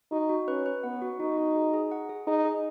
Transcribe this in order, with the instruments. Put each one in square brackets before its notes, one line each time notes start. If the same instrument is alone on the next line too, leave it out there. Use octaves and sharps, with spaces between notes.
[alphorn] D#4 [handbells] F#4
[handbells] F#4
[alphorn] C#4 [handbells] B4
[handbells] B4
[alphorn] B3 [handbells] F#5
[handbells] F#4
[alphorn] D#4 [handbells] F#4
[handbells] F#4
G#4
G#4
F#5
G#4
[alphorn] D#4 [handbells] G#4
[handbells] G#4